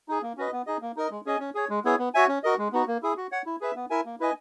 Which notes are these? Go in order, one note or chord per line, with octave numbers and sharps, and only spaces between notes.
D#4 G#4
A#3
C#4 F#4 B4 D#5
B3
D#4 G#4 D#5
A#3
D#4 A#4 D#5
G#3
C#4 G#4 D#5 G#5
C#4
G#4 C#5
G#3
B3 E4 G#4 C#5
B3
F#4 C#5 E5 G#5
C#4
F#4 A#4 D#5
G#3
B3 D#4 F#4
A#3
E4 G#4
F#4
C#5 F#5
E4
G#4 B4 E5
B3
E4 A#4 E5 G#5
A#3
E4 B4 D#5 G#5